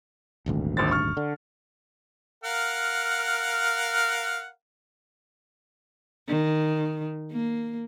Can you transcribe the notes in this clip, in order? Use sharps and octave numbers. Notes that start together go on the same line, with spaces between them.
D#1 G#1 D2
A#1 D#2 A6
C#6 F6
D3
A#4 F5 F#5
D#3
A#3